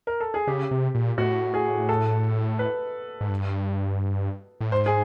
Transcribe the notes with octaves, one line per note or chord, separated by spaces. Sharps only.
A#4
A4
G#4
C#3 G4
C3
A#2
A2 F#4
G#4
A4
B4
G#2
G2
A2
G#2 C5
G#4